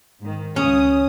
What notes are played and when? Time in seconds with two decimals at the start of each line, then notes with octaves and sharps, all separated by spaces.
0.20 G#2 D#3
0.56 C#2 C#3 C#4 D#6